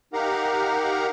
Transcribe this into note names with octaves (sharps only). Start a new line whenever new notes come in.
D#4 G4 A#4 F5 F#5 A#5